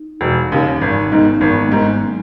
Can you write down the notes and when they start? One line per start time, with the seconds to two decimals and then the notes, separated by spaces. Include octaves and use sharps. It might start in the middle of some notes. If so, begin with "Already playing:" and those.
Already playing: D#4
0.21 E1
0.52 D#2 C#3
0.81 G#1 D#4
1.01 D#4
1.12 G#2 D#3 B3
1.21 C#4
1.34 C#4
1.41 G#1 B3
1.52 G#3
1.62 A#3
1.72 G#2 D#3
1.81 G#3
1.94 G#3
2.01 F#3